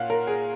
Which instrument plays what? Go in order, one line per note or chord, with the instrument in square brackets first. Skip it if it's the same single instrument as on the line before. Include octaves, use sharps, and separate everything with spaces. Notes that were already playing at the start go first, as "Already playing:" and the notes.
Already playing: [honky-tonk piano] A#2 C#4 F5 F#5
A#4
G#4